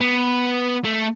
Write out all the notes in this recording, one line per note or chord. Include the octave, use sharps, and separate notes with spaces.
B3
A3